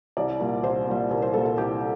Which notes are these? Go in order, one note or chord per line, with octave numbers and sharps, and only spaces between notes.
C2 D5
A#2 G3
C2 C5
A#2 G3
C2 A#4
C5
A#2 G3 A4
A4
C2 G4